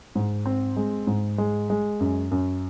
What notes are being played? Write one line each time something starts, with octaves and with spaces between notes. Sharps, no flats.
G#2
C4
G#3
G#2
G#3
G#3
F#2
F#2